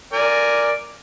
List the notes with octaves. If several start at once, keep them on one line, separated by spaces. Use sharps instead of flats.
A#4 D5 G#5